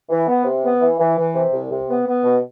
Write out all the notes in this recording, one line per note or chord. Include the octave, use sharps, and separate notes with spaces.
E3
B3
C3
B3
E3
E3
E3
C3
C2
C3
B3
B3
B2